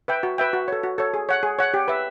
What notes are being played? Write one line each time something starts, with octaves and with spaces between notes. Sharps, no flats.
B4 E5 G5
F#4
B4 E5 G5
F#4
A4 C#5
F#4
A4 C#5
G#4
C#5 F#5
G#4
C#5 F#5
G4
B4 E5